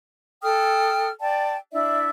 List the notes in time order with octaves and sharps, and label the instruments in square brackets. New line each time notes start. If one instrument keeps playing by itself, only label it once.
[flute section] A4 G5 D#6 F6
D5 G5 A5
D4 E4 D5 E5